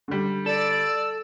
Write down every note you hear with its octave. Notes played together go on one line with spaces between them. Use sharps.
D3 G3
A4 D5 E6